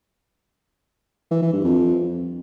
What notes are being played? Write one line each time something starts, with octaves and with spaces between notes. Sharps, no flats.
E3
E3
G2
F2